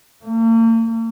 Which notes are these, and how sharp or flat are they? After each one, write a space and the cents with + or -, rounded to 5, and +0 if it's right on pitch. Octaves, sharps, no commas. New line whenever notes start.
A#3 -45